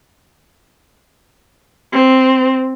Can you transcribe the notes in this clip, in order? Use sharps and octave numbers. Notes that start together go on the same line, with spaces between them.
C4